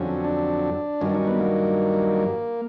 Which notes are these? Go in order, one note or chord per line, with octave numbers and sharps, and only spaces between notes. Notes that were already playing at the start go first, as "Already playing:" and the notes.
Already playing: F2 D3 F#3 C#4
D4
G2 D#3 F#3 C#4
D4
C#4
B3
A#3